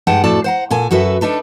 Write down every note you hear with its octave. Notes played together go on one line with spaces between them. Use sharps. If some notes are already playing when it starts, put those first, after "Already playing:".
G2 G#3 D#4 F#5 G5 A5
F2 A2 F#4 A4 D5 A5
C5 F#5 A#5
A#2 A4 G#5
F#2 F#4 A4 B4 E5
D4 D#4 A4 B4